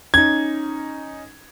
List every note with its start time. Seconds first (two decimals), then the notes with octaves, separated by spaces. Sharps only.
0.14 C#4 D#4 G#6